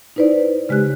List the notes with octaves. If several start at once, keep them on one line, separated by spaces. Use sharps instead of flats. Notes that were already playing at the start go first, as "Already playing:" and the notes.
D#4 E4 B4 C5 D5
C#3 G#3 G4 F#6